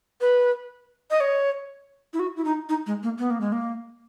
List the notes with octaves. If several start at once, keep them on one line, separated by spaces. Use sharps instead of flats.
B4
D#5
C#5
E4
F#4
E4
D#4
D#4
G#3
A#3
B3
A#3
G#3
A#3